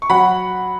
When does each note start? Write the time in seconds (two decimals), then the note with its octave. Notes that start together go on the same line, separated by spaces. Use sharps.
0.02 C#6
0.10 F#3 F#5 B5